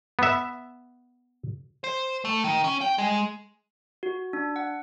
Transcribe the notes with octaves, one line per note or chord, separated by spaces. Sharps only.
B3 E5
C5
A3
D#3
C#4
G5
G#3
F#4
D4
F#5